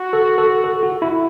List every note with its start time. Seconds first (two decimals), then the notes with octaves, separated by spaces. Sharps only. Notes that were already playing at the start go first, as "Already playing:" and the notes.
Already playing: F#4
0.13 A4
0.38 A4
0.64 A4
0.83 F#4
1.02 E4